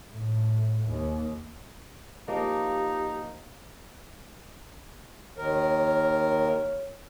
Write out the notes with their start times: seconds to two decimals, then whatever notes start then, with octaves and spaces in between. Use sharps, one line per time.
0.12 A2
0.88 D#2
2.28 F3 A#3 D#4 G4
5.38 D#2 D#3 A#4 C#5